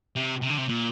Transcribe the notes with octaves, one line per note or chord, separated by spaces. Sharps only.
C3
C3
D3
C3
A#2